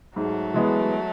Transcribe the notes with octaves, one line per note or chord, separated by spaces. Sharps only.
G#2 F#3 A3
E3 G#3 B3